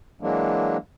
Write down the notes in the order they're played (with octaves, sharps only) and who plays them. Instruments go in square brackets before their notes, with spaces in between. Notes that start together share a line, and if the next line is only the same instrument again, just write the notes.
[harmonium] E3 F#3 G#3 A#3 D4